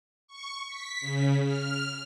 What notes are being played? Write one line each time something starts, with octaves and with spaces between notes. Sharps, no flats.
C#6
B6
C#3
F6